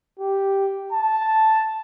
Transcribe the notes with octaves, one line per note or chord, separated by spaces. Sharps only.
G4
A5